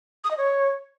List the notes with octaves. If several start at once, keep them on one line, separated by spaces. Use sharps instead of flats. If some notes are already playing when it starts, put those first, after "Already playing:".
D#6
D#5
C#5